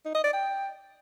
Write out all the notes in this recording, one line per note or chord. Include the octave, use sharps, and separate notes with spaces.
D#4
D#5
D5
G5